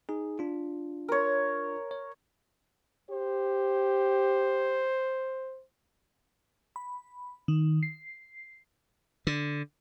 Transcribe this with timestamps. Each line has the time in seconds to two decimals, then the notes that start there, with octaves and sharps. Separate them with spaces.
0.09 D#4 G#4
0.39 D4 F4
1.09 A#4 C#5
1.91 C#5
3.11 G4 C5
6.76 B5
7.48 D#3
7.83 C7
9.27 D3